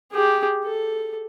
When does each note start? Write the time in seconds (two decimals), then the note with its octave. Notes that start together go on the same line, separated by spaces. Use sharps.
0.12 G4 G#4
0.65 A4